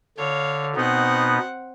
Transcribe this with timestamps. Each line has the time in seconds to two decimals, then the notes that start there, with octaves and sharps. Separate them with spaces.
0.17 D3 C#5 F5
0.76 B2 B3 C4 D#4 F#5